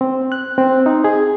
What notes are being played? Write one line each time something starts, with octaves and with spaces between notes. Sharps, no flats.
C4
F#6
C4
D#4
G#4